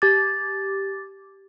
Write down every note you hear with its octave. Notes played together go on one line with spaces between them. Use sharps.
G4 D6 A6